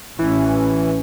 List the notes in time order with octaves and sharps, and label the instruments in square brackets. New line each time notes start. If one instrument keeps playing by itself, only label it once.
[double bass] A1 C#4 [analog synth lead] E3